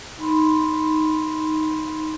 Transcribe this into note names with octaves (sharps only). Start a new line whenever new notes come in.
D#4 B5 C6